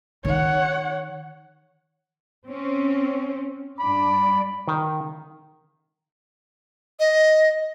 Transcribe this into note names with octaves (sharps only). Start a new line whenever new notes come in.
D#3 D#4 C#5 F#5
C4 C#4
G2 D4 D5 B5
D#3
D#5